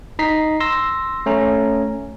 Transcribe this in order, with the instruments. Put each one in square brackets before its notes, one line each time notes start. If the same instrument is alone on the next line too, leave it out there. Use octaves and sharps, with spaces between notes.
[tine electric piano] D#4 D#5 A#5 B6 C7
C6 E6 A#6
A3 C#4 A#5